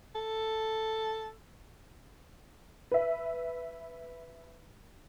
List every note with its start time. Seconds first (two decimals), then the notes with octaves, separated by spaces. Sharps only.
0.15 A4
2.92 B4 E5